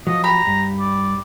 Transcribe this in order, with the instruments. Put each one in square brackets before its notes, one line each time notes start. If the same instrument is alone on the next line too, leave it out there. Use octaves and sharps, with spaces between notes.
[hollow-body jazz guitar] F3 F#3 [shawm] D#5
[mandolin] G4 B5 [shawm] A#5
[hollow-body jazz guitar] G2
[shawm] D5